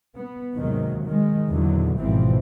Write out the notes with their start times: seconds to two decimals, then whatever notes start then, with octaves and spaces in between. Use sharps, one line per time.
0.15 B3
0.56 D#2 G#2 C3 D#3 F#3
1.04 D#3 G#3
1.48 E2 A#2 D3 D#3 F#3
1.99 G#1 B2 E3 F3 C4